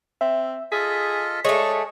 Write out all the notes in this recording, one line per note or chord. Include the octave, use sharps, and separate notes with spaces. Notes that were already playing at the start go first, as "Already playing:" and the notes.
C4 E5
F4 G#4 A4 D#5 B6
G#3 A3 C#5 D5 C#6